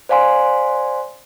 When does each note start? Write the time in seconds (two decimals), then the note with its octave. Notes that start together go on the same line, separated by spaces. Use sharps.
0.09 C5 D5 F5 G#5 C6